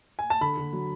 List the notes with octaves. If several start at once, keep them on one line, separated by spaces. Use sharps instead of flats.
G#5
A5
D3 B5
D3
F#3